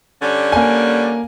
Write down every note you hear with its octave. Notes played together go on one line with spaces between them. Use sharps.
D3 G3 C#4
A#3 G#5